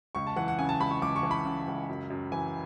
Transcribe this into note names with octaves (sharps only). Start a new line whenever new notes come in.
C#2 C#6
A5
E3 F#5
F#5
C#3 G#5
A5
C#2 B5
C#6
C#2 D6
C#6
E3
B5
C#3
C#2
F#2
F#2
E3 G#5